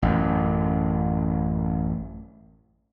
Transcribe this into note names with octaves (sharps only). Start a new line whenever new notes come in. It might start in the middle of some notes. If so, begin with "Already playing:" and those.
A1 F#2